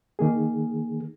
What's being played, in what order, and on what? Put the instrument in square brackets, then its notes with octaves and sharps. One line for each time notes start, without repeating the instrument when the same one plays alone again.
[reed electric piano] D#3 A#3 G#4